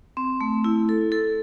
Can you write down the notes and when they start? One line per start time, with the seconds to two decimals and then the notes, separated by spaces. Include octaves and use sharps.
0.17 C4
0.41 A3
0.64 E4
0.89 A4
1.12 A4